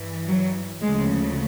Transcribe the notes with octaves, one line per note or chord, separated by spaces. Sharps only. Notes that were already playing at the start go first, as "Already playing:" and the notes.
Already playing: G2 E3
F#3
D2 C#3 F3 G#3